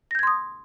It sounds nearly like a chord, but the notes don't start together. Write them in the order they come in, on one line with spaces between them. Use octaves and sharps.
A#6 G6 G#6 C6 D#6